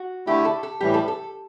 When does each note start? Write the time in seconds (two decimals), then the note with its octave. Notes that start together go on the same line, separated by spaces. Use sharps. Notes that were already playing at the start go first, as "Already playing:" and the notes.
Already playing: F#4
0.27 D3 A3 E4 G4
0.45 A4
0.63 A4
0.80 A2 E3 G3 G4
0.94 A4
1.08 A4